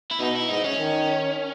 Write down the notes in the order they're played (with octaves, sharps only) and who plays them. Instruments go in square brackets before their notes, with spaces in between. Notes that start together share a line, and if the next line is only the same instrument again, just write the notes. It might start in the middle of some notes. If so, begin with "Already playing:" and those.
[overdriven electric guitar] E4
[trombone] B2 [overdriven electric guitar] D#4
[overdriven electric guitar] E4
[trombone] G#2 [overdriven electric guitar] D#4
[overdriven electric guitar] C#4
[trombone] D#3